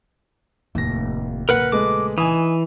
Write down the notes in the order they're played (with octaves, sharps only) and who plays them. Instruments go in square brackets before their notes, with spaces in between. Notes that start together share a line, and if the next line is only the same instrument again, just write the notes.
[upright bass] F1 A2 [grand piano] D#2 A#6
[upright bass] A#1 C#3 [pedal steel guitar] A#4 B4 F#5
[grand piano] G#3 A3 B4 [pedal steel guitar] D6
[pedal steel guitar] E3 [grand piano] D#4 G#5 D#6